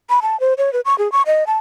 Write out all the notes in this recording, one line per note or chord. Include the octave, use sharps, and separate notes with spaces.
B5
A5
C5
C#5
B4
C#6
G#4
C#6
D#5
A5